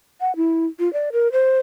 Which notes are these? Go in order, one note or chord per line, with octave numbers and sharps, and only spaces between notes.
F#5
E4
F4
D5
A#4
C5